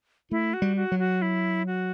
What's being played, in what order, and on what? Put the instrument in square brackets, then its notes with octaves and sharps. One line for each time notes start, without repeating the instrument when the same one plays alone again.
[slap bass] A3 [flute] E4
[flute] F#4
[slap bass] G3
[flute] F#4
[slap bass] F#3
[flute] F#4
E4
F#4